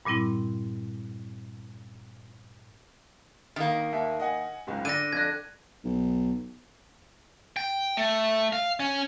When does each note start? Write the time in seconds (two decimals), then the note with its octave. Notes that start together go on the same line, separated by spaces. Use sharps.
0.05 G2 A#2 G3 C4 E4
3.56 D#3 A#3 D#4
3.92 D#2 E5
4.20 D#5 F#5 G#5
4.67 F#1 C#2 G#2
4.85 D3 D5 A#6 D#7
5.13 F2 D5 F#6 G#6 A#6
5.84 B1
7.57 G5
7.97 A3
8.53 F5
8.80 C#4